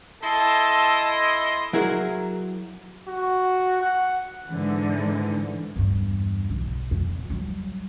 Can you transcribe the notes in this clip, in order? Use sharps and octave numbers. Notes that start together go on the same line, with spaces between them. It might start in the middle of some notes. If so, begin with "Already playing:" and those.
E4 A4 D#5 A5 C6
F#3 E4 G#4 A#4
F#4
F#5
G#2 D3 E3
E2 G2
B1
F2 A#2
F#3 G3